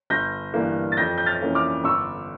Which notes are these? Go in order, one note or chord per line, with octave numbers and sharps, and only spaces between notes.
G1 G6 A#6
G2 E3 A#3
A6
F2 G6 A#6
G6
F6 A6
E3 A#3 C#4
D6 F6
G1 C#6 E6